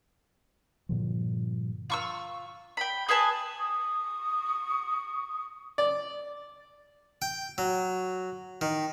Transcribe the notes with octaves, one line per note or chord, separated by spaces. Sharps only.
G2 A#2 D3 F3
F4 C#6 E6
G5 B5
G#4 B4 G#5 A5
C#6 D#6
D5
G5
F#3
D#3